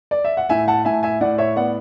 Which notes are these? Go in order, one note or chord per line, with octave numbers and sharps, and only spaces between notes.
D5
E5
F#5
A2 E5 G#5
F#5 A5
A2 E5 G#5
E5 G#5
A2 D5 F#5
C#5 E5
B3 D5 F#5